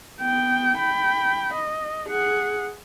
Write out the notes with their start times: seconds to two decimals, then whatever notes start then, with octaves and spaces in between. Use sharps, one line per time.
0.21 B3 G5
0.78 G5 B5
1.54 D#5
2.09 G#4 F#5